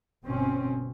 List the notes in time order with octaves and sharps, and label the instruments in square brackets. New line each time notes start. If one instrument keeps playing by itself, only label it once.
[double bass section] G1 B2 C4 C#4